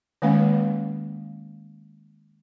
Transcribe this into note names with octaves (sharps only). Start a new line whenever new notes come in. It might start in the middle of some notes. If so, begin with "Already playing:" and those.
D#3 G#3 A#3 C#4 B4 F5